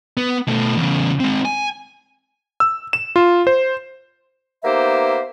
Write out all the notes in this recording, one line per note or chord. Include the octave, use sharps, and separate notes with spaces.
B3
B2 A3
E2 C#3
G#3 C4
G#5
E6
E7
F4
C5
A#3 B3 D#4 G4 C5 E5